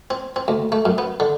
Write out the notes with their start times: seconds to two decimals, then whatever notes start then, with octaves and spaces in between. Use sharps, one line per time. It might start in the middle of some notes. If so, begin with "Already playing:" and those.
0.10 C4
0.36 C4
0.48 D2
0.72 A3
0.85 F#2
0.98 B3
1.20 D3